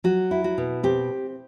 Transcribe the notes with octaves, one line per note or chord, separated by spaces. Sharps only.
F#3 F#4
E4
F#4
B2
C4 G4